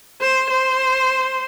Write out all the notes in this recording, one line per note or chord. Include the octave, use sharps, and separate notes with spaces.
C5
C5